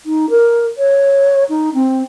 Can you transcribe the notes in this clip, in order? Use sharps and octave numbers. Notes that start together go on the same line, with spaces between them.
D#4
A#4
C#5
D#4
C4